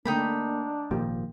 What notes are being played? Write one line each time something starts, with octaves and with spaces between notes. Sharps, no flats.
D3 A3 A#3 D4 D#4 A#4 G5 B5
G#1 A#2 D#3 F3 A#3 G4